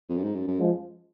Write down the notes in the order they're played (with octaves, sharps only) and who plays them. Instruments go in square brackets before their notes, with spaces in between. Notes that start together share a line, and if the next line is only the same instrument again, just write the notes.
[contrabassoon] F2
F#2
G#2
F#2
F#2
[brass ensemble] F3 G#3